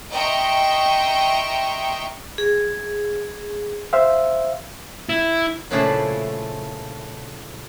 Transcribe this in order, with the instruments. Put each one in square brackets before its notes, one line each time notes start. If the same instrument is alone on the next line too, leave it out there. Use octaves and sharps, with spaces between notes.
[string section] D#5 E5 G5 A#5 C6 C#6
[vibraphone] G#4
[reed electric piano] C5 E5 F5
[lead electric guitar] E4
[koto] A#2 C#3 F3 A3 D4 E4